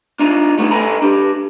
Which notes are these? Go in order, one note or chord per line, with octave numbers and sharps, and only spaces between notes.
D4 D#4 F4
G3 A3 B3 D#4
A4 B4 D#5 G#5 A#5 B5
D4 G4